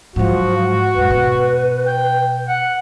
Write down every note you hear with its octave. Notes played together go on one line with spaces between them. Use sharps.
G#2 F3 F#3 F#4
F2 G#2 B4
B2
G5
F#5